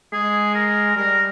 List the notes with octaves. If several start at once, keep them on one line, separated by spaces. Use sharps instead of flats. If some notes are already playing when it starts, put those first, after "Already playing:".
G#3 G#4
A#4
G3 A#4